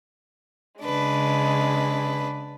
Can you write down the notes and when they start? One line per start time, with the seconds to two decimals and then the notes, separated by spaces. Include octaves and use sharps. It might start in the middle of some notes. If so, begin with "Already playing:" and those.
0.82 C#3 G#3 D4 B4